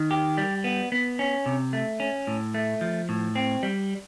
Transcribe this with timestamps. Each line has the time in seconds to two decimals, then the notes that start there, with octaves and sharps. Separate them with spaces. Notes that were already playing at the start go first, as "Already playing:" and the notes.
Already playing: D#3
0.11 G4
0.37 G3
0.64 B3
0.92 B3
1.19 C#4
1.46 C3
1.73 A3
2.00 C#4
2.27 A2
2.54 A3
2.81 F3
3.09 A2
3.35 C4
3.63 G3